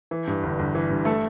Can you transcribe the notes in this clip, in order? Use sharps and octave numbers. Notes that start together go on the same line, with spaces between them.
E3
G2
G1
G1
E3
G2
A3 A4